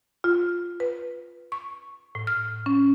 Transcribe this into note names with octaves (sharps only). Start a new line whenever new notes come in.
F4
B4
C#6
A2
F6
C#4